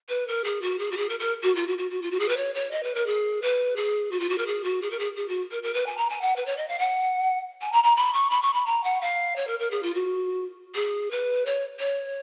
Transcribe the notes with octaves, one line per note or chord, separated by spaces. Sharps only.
B4
A#4
G#4
F#4
G#4
F#4
G#4
A#4
A#4
F#4
F4
F#4
F#4
F#4
F4
F#4
G#4
B4
C#5
C#5
D#5
B4
A#4
G#4
B4
G#4
F#4
F4
F#4
A#4
G#4
F#4
G#4
A#4
G#4
G#4
F#4
A#4
A#4
B4
G#5
A#5
G#5
F#5
B4
C#5
D#5
F5
F#5
G#5
A#5
A#5
B5
C#6
B5
C#6
B5
A#5
F#5
F5
C#5
A#4
A#4
G#4
F4
F#4
G#4
B4
C#5
C#5